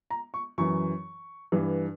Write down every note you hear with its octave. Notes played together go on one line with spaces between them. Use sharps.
A#5
C#6
F#2 E3 C#6
G2 E3